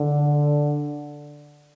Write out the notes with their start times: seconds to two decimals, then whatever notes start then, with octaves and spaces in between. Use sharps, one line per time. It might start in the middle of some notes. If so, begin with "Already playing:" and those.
Already playing: D3